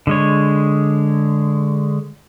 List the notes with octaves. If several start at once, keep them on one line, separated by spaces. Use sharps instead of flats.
D3 G#3 C#5